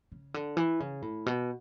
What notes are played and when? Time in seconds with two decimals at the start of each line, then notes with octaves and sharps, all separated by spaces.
0.12 C#3
0.34 D3
0.57 E3
0.80 C#3
1.02 A2
1.26 B2